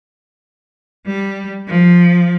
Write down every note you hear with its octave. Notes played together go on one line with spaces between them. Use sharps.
G3
F3